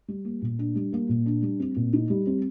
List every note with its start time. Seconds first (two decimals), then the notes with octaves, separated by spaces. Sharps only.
0.08 G3
0.25 A#3
0.42 A#2
0.59 D4
0.75 G3
0.92 A#3
1.09 A#2
1.26 D4
1.42 G3
1.60 C4
1.76 A#2
1.93 D#4
2.10 G3
2.27 C4